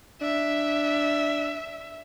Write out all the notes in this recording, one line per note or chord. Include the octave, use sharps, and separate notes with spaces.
D4 E5